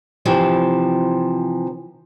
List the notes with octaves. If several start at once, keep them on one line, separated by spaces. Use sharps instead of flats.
C3 E3 F3